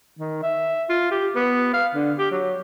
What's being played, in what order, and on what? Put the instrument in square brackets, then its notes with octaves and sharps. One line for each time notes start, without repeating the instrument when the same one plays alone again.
[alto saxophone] D#3
E5
F4
G4
B3
F5
D3
G4
F#3